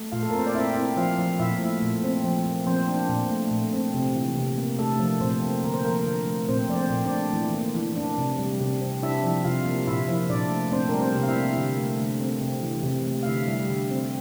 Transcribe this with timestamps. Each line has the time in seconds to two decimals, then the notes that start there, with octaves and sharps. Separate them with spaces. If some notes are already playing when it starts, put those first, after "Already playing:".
Already playing: A3
0.12 A#2 F4 F5
0.23 A4
0.31 A#4
0.34 C4 C5
0.46 D5
0.54 C4 E4 E5
0.76 C4
0.97 F3 F4 F5
1.19 F3
1.39 A#2 E4 E5
1.61 A3
1.82 A#2
2.04 C4
2.24 F3
2.46 A#3
2.66 F3 C4 C5
2.88 D4
3.10 A#2
3.30 A3
3.51 A#2
3.73 C4
3.94 C3
4.15 E3
4.37 C3
4.58 A#3
4.78 A3 D4 A4
4.99 F3
5.21 A#2 C4 C5
5.42 A#3
5.64 D3 A#4
5.74 C5
5.85 F3 A#3 A#4
6.06 D3
6.27 A3
6.49 A#2 C4 C5
6.69 F3 D5
6.77 C4 C5
6.90 A#2
7.05 D4 D5
7.11 A3
7.33 E3
7.54 A#3
7.75 E3
7.97 D4
8.18 C3
8.39 G3
8.60 C3
8.82 C4
9.03 D4 E4 E5
9.24 F3
9.44 C3 F4 F5
9.66 A#3
9.87 A#2 E4 E5
10.08 F3
10.30 A#2 D4 D5
10.51 A3
10.72 C4 D4 C5
10.89 G3 A#4
11.00 C4 C5
11.15 C3
11.23 F5
11.28 E4 E5
11.36 A#3
11.57 D3
11.78 A3
12.00 D3
12.21 C4
12.42 C3
12.63 E3
12.84 C3
13.06 A3
13.23 F5
13.26 D3 E4 E5
13.48 G3
13.69 D3
13.90 C4